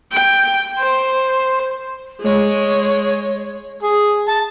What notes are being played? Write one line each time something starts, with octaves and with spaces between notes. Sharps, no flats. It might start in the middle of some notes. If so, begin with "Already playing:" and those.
G5
C5
G#3 C#5
G#4
A5